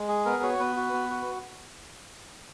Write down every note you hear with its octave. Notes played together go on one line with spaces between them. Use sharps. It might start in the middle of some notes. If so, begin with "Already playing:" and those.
Already playing: G#3
G#4
B3 A#4
F#4 C#5
B3 B4
F#4
B3
F#4